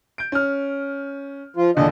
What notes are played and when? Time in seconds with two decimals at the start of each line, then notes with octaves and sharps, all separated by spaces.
0.18 G6 D7
0.32 C#4 F6
1.56 F3 F4
1.77 E2 A#2 D3 D4 D#5